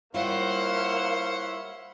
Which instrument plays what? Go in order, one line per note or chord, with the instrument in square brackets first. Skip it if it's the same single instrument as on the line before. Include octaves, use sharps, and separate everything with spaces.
[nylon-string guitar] G3 F4 [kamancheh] A#3 F5 [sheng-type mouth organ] E4 C#5 [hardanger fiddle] C5 F#5